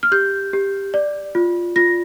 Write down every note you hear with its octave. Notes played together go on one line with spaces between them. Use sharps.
F6
G4 G6
G4
D5
F4
F4 A#6